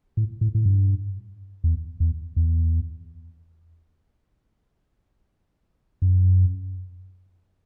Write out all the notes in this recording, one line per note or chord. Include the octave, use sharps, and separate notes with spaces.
A2
A2
A2
G2
E2
E2
E2
F#2